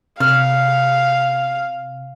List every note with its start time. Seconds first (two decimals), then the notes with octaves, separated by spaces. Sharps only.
0.20 C3 F5 F6